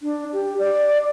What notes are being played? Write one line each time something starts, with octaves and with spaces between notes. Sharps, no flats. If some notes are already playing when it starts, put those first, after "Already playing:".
D4
G4
D5